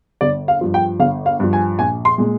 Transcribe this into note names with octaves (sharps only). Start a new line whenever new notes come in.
G1 D5
F5
G2 F3
G5
G1 F5
F5
G2 F3
G#5
A#1 G#5
C6
A#2 G#3